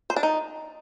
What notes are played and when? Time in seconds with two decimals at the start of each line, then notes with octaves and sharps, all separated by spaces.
0.10 C5
0.16 D4
0.23 D#4